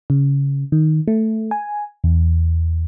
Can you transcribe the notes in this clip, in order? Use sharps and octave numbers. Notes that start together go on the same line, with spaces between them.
C#3
D#3
A3
G#5
E2